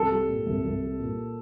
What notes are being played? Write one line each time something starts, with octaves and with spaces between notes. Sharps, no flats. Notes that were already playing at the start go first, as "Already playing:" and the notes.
Already playing: C2 A4
G3
A#2
C2
C2
G3
A#2